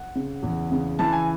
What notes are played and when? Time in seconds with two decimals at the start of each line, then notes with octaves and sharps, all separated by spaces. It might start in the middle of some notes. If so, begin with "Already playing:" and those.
Already playing: F#5
0.15 C#3
0.43 E2
0.72 C#3
0.99 E3 A5
1.12 G#5